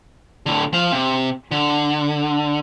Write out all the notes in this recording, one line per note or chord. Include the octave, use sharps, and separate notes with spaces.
A2 D3
F3 F5
C3
D3